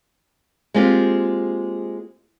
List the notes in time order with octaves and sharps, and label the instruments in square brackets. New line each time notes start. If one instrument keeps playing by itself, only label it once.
[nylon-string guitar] G#3 A#3 C4 F4 G4